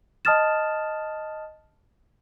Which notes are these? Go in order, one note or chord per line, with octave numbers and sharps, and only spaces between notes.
D#5 A5 D#6 F6 A6 E7